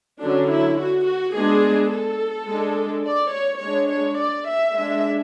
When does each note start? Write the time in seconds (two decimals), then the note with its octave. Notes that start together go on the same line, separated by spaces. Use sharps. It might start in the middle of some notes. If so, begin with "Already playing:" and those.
0.21 D3 F#3 C#4 D4
0.49 E4
0.79 F#4
1.07 F#4
1.35 G#3 B3 D4 G#4
1.91 A4
2.49 G#3 D4
3.06 D5
3.34 C#5
3.63 G#3 D4 C#5
3.91 C#5
4.19 D5
4.48 E5
4.77 G#3 D4 E5